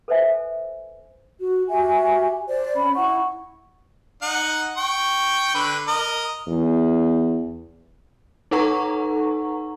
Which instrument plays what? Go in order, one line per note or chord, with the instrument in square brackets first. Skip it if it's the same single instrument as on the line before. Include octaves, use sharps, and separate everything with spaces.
[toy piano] A4 B4 C5 E5 G#5
[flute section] F#4
F#4 G4 E5 G#5
C5 D5
C#4 B5
E4 F#5 C#6
[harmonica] D#4 F#5
G5 C#6
D3 B4
A#4 D#5 A#5
[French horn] E2
[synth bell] D#4 A4 B4 F#5 A#5 C#6